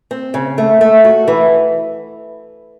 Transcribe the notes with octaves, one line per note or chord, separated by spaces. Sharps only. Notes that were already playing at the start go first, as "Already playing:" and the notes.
C4
C#3
A3
A3
F#4
E3